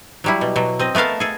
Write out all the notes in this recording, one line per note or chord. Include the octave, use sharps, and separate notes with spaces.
F#3 G3 E4
B2
B2 F#3
C4 D#5
A3 B3 A#4 F5 A5
G#4 A4